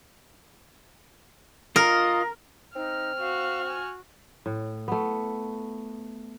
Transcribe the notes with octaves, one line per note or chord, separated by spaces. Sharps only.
F4 A#4 D#5
C4 D#4 F6
F#4 F5
G#5
A2
A3 B3